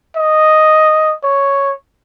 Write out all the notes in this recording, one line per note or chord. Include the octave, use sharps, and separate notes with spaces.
D#5
C#5